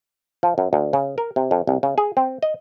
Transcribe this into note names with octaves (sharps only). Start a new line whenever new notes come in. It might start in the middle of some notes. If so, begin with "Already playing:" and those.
F3
F#2
D2
C#3
A#4
C3
F2
C2
C#3
G#4
C4
D#5